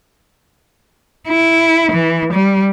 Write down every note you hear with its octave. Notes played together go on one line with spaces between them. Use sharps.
E4
E3
G3